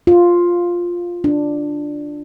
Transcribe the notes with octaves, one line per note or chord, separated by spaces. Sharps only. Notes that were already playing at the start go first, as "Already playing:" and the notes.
F4
D4